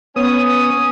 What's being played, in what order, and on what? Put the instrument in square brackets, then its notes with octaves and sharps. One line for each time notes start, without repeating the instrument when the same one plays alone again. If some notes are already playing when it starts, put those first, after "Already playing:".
[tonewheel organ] B3 [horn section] C#4 [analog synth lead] D#6